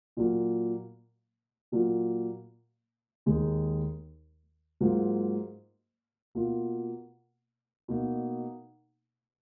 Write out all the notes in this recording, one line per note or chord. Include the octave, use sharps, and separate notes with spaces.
A#2 F#3 A#3
A#2 F#3 A#3 F4
D#2 D#3 G#3 D#4
G#2 F#3 A#3 F4
B2 A#3 F4
B2 A#3 D#4